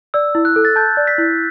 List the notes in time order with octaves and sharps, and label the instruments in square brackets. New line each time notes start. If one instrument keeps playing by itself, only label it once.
[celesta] D5 [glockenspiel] E6
[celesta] E4
[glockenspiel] F#6
[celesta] A4
[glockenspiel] A6
[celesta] A5 [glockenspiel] G6
[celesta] D5
[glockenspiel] B6
[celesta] E4